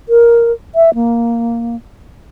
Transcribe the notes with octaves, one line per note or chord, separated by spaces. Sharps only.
A#4
E5
A#3